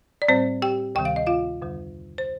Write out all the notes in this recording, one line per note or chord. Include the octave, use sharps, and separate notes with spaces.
D5
A2 G3 C4 C5
G4 G5
D2 C3 D#3 G3 G5
F5
D#5
F4 F5
F2 D3 G3
C5